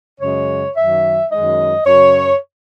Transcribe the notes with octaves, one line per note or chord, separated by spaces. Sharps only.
F#2 C#3 G#3 C#5
F#2 D#3 F#3 E5
F#2 D#3 G#3 D#5
F#2 C#3 F#3 C#5